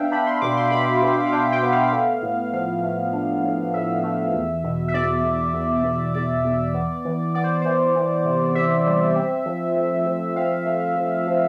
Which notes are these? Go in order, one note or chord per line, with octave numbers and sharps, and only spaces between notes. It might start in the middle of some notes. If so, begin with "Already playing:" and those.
Already playing: B3 D4 E5 F5 G5
D4 B5
C6
B2 D6
C6
B2 B5
B2
F5
D4 G5
G5
B3
F5
A3
A2
F3 F5
A3
D4
A2
A2 E5
A3
E2
B2
E5
E2 D5
E2
E2
E2
E2 D5
E2
B3
E3
B3 D5
C5
E3 C5
E3
C3
C3 E5
G3
C4
F3
A3
F3
C4 F5
A3
F3
F3